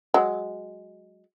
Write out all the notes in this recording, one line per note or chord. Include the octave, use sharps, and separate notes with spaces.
F#3 G#3